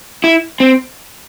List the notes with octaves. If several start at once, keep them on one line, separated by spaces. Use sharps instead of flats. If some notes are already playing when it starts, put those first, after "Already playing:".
E4
C4